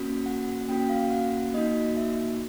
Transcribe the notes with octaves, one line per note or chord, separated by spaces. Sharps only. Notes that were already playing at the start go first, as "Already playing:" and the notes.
Already playing: A#3 C#4 F#4
F#5
A#3 C#4 F#4 G5
F5
F#5
A#3 D#4 F#4 D#5
E5